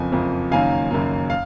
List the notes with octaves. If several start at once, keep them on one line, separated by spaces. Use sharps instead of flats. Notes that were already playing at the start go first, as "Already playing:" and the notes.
Already playing: F#1 F2 F3 G#5
F#1 F2 F3
F#1 F#2 D#3 A#3 F5 G#5
F#1 F#2 D#3 A#3
F5